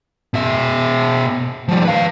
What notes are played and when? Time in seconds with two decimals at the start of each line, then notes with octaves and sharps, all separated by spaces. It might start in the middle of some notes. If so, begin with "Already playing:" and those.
0.34 B2 E5
1.68 F3 G3
1.85 B4 F5